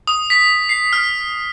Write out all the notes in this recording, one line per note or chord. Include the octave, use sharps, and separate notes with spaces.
D#6
B6
C7
F6